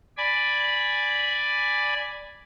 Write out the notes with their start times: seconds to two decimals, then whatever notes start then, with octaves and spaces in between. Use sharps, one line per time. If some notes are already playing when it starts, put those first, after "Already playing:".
0.17 D5 G#5 B5